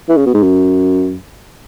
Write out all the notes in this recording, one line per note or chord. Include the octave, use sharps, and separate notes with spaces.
E3
C#3
B2
G#2
F#2